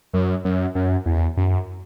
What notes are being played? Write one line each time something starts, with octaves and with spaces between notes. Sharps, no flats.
F#2
F#2
F#2
E2
F#2